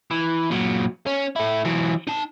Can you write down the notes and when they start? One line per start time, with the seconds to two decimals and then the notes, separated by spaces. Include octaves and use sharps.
0.11 E3
0.51 A#2 F#3
1.07 C#4
1.36 A3 E4
1.65 E3 F#3
2.07 D#4 A5